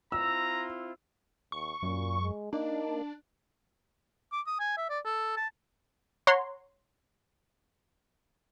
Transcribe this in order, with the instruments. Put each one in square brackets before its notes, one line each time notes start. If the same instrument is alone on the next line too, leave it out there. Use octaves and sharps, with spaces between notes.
[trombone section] C4 E4 F4 [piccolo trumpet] A#5 [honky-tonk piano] E6
[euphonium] D#2 [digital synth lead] C#6
[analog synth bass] F#2 [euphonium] A#2
[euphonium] G#3
[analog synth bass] A#3 [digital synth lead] D4 [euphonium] D#4
[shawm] D6
D#6
G#5
E5
D5
A4
A5
[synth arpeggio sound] C#5 F#5 A#5 C6 C#6